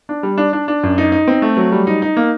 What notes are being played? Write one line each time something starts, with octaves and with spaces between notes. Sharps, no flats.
D4
G3
D4
D4
D4
F#2
D#4
D#4
C4
A3
F#3
G3
D#4
D#4
A#3